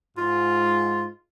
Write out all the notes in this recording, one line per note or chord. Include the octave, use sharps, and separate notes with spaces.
G#2 F4